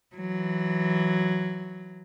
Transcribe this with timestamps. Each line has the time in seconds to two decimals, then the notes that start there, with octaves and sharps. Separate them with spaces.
0.15 E3 F#3